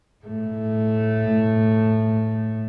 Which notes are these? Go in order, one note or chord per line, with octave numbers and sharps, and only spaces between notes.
A2 A3